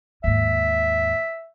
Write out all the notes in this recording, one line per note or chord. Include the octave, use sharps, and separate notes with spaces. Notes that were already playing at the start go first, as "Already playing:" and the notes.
D#2 G#2 E5